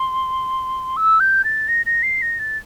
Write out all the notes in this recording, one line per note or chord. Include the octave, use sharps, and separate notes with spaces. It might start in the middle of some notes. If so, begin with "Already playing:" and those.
Already playing: C6
E6
G6
A6
A#6
A#6
C7
A#6
A6